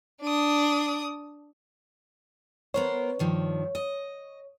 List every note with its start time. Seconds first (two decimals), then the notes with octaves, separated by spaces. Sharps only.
0.21 D4 D#6
2.74 B3 A#4 C5 C#5
3.19 G2 D#3 F3
3.75 D#5